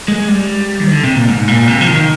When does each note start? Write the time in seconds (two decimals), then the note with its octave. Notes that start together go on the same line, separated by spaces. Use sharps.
0.08 G#3
0.28 G3
0.80 D#3
0.91 D3
1.04 C3
1.15 A#2
1.28 G#2
1.48 A#2
1.68 C3
1.81 F3
1.88 D#3